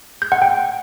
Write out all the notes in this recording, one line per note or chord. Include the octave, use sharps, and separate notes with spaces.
G6
F#5
G5